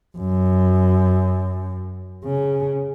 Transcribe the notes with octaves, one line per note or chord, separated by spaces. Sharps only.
F#2
C#3